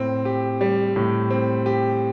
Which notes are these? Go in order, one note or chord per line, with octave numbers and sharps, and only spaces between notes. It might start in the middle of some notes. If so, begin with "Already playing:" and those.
Already playing: A2 C4
G4
G3
A2
C4
G4